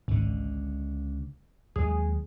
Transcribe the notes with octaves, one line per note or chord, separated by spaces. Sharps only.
G#1 C#2 D3
D#2 F#3 G#3 G#4